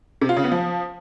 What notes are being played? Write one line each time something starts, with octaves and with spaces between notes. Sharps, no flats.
C3
F4
C#3
B3
F3